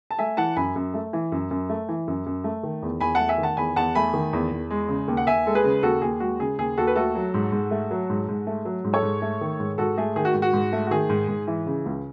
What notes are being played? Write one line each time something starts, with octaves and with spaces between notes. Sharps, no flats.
A5
A3 E5 G#5
E3 F#5 A5
F#2 G#5 B5
F#2
A3
E3
F#2
F#2
A3
E3
F#2
F#2
A3
D#3
E2
E2 G#5 B5
A3 F#5 A5
E5 G#5
D#3
F#5 A5
E2 G#5 B5
E2 F#5 A5
A3 G#5 B5
D#3
E2
E2
G#3
C#3
D#2
F#5
D#2 E5 G#5
G#3 A4
G#4 B4
C#3
D#2 F#4 A4
D#2 G#4
G#3 F#4
C#3 G#4
D#2 G#4
D#2 F#4 A4
B4
A3 F#4 A4
F#3
G#2
G#2
A3
F#3
G#2
G#2
A3
F#3
G#2
A4 C#5
G#2
A3
D#3
G#2
G#2 F#4 A4
A3 G#4
D#3 G#4
F#4
G#2
F#4
G#2
A3
F#4
D#3 G#4
G#2
G#2
E3
C#3
C#2